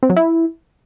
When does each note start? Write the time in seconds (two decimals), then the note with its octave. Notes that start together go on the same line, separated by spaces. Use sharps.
0.03 C4
0.10 F#3
0.16 E4